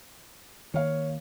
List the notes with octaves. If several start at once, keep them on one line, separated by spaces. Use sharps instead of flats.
D#3 A#3 C#5 F5